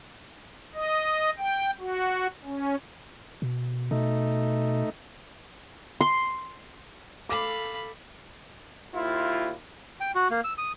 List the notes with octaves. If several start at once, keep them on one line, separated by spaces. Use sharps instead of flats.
D#5
G5
F#4
C#4
B2
B2 A3 D#4
C6
A4 F5 B5 D6
D#2 E4 F4
G5
F#4
A#3
E6
D#6